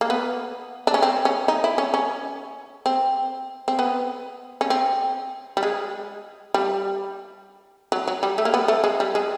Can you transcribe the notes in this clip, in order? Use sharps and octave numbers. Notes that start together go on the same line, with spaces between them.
A#3
B3
D4
C#4
C4
C#4
D#4
E4
C#4
C#4
C4
C4
B3
C#4
C4
G3
G#3
G3
F#3
F#3
G3
A3
A#3
B3
A3
G#3
G3
G#3